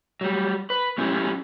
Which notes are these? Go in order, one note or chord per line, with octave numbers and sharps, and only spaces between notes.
F#3 G3
B4
F#3 C#4 E4 G4